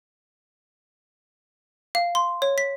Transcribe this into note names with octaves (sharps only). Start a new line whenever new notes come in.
F5
C6
C#5
B6